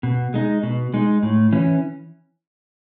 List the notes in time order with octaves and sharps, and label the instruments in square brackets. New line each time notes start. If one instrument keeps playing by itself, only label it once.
[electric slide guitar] B2
G#3 D#4
B2
G#3 D#4
A2
E3 C#4